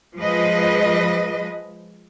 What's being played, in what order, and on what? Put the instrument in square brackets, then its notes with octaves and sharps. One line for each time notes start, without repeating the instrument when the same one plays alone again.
[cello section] F3 G#3 B4 D#5